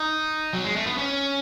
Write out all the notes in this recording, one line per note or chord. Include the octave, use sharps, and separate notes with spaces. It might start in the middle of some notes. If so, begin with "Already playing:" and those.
Already playing: D#4
F#3
G#3
A3
B3
C#4